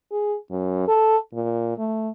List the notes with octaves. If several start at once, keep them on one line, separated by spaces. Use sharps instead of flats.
G#4
F#2
A4
A#2
A3